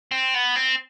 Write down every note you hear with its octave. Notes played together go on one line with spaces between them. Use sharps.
C4
B3
C4